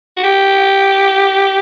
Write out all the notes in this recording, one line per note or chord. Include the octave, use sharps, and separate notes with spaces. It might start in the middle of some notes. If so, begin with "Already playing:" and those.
F#4
G4